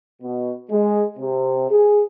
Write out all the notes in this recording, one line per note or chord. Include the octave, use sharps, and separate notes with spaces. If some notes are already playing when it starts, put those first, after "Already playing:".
B2
G#3
C3
G#4